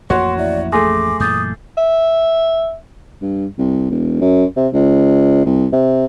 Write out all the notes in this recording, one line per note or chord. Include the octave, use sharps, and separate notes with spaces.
A1 F2 A#3 F#4 C#5 C6
E4 D5 E5
A3 G#4 G#5 C6 D6 A#6
F#2 A#2 E3 D6 D#6 G6 A6
E5
G2
C2
E1
F#2
C3
C#2
C2
C3